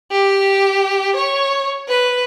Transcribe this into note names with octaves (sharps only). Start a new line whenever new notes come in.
G4
C#5
B4